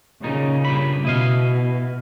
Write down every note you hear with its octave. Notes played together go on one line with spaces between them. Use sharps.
A#2 C#3 D#4
G2 A#2 B5
B2 E4 D#5 F5